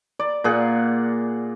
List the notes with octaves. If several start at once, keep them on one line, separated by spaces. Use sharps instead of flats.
D5
A#2 G#4 F#5